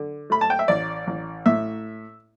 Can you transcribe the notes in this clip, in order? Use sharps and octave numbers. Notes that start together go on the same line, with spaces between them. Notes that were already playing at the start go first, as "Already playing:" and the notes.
Already playing: D3
A3 B5
A5
G5
E5
A1 D5
A1
A2 E5